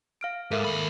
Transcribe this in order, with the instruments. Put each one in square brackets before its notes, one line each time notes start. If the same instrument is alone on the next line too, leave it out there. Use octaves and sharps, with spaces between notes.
[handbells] F5 F6 D7
[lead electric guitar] G#2 [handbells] A4 A#4 E5
[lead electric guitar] D#2 B5